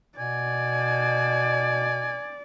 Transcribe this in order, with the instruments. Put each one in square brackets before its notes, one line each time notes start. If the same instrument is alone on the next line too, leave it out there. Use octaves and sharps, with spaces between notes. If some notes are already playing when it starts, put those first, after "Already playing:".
[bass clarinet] B2 [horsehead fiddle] D5 [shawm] G#5